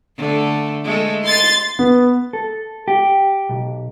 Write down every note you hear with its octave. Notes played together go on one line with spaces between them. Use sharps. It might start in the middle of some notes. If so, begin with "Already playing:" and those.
D3 A3
G#3 A3 A4
D#4 C6 A6
B3
A4
G4
B1